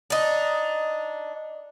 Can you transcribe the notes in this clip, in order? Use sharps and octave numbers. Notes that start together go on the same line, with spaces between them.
D4 D#4